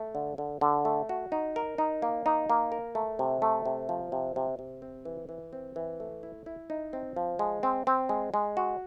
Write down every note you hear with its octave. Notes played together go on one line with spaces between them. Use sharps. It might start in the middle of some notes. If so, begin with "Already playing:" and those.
Already playing: A3
D3
D3
D3
A3
F#4
D#4
A#4
D#4
A#3
D#4
A#3
A#4
A3
C3
A3
C3
F3
C3
C3
C3
C4
E3
E3
C4
E3
A3
E4
E4
D#4
C4
F3
G#3
C4
C4
G#3
G#3
F#4